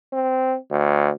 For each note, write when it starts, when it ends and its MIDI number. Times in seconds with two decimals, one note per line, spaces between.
0.12 0.56 60
0.71 1.10 38